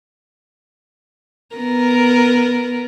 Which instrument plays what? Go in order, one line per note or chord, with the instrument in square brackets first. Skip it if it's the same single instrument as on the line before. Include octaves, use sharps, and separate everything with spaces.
[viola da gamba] B3 A#4